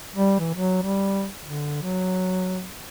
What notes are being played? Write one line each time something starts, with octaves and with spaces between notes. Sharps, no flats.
G3
E3
F#3
G3
D3
F#3